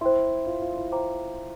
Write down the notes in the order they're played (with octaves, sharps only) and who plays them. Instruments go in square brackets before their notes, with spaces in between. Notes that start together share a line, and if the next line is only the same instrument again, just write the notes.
[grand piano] E4 [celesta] C5 G5 C6
[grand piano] F4
F4
E4
[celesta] C5 G5 A#5 D6